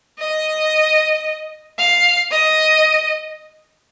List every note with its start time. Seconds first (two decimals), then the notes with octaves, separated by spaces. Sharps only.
0.20 D#5
1.79 F5
2.31 D#5